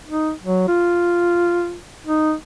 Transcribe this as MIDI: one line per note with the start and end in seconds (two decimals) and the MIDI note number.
0.08 0.31 63
0.42 0.67 54
0.68 1.76 65
2.06 2.33 63